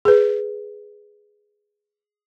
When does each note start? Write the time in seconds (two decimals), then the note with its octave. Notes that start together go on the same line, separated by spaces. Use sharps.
0.05 G#4 B4